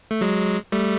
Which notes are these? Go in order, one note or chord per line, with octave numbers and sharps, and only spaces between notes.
A3
F#3 G#3
G3 A3